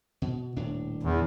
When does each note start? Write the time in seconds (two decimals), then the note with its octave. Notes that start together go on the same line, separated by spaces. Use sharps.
0.22 B2
0.56 D#1 A2 D4
1.03 E2